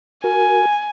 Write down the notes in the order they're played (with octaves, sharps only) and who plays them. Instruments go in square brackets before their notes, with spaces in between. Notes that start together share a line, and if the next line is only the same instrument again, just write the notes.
[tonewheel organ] F#4 A#4 [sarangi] G#5